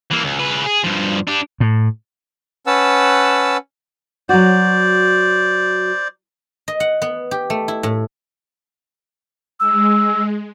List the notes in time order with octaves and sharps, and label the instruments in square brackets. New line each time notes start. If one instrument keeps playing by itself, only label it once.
[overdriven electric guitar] E3 A#3
C#2
C#3 B4
G#4
G2 F3
D4 G4
[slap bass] A2
[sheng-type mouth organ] C#4 B4 F#5 A5 E6
[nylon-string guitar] F#3 F#4 [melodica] C5 D5
[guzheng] D#5
F#5
B3
G4
A3
E4
A2
[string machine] G#3 [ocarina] E6